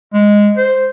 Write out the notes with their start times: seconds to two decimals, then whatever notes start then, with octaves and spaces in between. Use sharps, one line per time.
0.14 G#3
0.57 C5